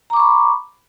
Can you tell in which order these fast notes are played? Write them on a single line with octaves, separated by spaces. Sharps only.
A#5 D6 C#6 B5